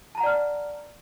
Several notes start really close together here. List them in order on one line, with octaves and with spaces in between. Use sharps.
A5 A#5 F#5 D5 F6